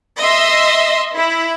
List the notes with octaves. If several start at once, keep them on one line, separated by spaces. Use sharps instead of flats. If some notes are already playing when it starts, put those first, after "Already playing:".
D#5 E5 C6
E4